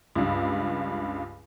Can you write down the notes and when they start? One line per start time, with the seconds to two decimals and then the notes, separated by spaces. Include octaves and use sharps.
0.15 C#2 G2